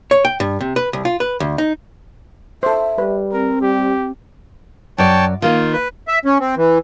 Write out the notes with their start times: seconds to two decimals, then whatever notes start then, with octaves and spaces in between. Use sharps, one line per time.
0.11 C#5
0.25 G5
0.40 G2
0.60 C3
0.76 B4
0.93 C2
1.05 F4
1.20 B4
1.40 D2
1.58 D#4
2.63 A4 C5 E5
2.98 G3 B4
3.32 C4 A#4
3.61 G3 G4
4.98 F#2 C#5 D5 G5 A5
5.42 D#3 A#3 D#4 F4
5.73 B4
6.08 E5
6.25 C#4
6.40 C4
6.57 E3